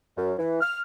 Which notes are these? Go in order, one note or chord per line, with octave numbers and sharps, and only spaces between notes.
F#2
E3
F6